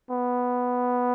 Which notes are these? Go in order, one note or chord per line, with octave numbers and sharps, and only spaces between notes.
B3